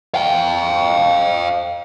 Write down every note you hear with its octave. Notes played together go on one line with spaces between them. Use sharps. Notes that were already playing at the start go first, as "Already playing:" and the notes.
F5 G5